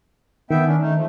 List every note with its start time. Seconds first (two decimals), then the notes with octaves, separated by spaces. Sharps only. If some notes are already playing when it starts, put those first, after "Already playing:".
0.51 D#3 B3 E5 G5
0.65 C#4 D4
0.80 A3 D#4
0.95 F3 A3